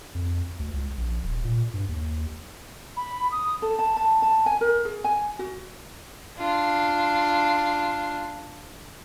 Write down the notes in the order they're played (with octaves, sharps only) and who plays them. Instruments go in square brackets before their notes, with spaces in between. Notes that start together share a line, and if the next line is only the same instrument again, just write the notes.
[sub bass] F2
D2
C#2
A#1
D#1
A#2
G2
D#2
[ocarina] B5
D#6
[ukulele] A4
A5
A5
A5
G#5
A#4
G#4
G#5
F#4
[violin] D4 F4